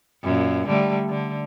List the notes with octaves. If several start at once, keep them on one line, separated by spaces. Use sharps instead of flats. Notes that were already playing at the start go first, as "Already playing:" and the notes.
F#2 A#2
D3 G3 A3
D3